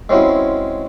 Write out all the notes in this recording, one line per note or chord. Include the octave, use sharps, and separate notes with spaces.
G#3 C4 C#4 E4 F#4